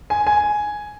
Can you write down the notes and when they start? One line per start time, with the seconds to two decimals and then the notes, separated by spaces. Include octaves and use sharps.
0.10 G#5
0.27 G#5